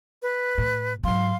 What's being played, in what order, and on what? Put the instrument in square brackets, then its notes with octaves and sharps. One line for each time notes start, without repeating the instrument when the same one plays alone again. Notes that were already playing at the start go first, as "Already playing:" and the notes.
[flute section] B4
[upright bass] A2
[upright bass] G#2 F#3 [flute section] F5 C6